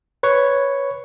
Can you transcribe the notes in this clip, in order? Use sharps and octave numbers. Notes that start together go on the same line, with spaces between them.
B4 C#5 C#6